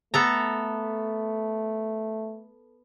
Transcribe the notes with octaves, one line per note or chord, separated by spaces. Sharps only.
A3 B3 A4 A#5